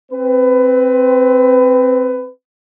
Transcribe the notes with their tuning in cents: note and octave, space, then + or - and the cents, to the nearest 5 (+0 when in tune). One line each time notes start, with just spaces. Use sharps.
C4 +0 B4 +25